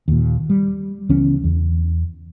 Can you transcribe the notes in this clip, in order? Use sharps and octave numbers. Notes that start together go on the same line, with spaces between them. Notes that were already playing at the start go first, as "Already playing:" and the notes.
D#2 A#2
G3
C#2 E3 B3 C#4
E2